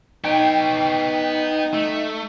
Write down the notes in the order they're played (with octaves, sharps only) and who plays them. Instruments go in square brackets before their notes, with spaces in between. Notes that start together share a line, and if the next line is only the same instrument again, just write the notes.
[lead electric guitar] B3 C#5 [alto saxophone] D#4 [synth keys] G5
[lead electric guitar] A3